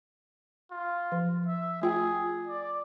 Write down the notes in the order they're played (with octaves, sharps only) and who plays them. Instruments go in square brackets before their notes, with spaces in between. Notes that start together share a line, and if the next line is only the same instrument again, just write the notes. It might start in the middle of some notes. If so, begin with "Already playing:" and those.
[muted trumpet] F4
[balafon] F3
[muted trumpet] E5
[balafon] A3 F4 G5 [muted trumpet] G#4
[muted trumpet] D5